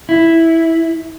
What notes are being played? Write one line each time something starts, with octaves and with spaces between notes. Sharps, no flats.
E4